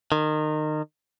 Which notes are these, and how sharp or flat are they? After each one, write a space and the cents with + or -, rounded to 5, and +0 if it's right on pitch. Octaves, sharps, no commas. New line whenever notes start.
D#3 -25